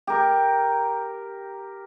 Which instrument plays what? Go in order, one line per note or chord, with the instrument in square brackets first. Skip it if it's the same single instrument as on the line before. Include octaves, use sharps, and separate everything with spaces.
[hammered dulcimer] G4 A#4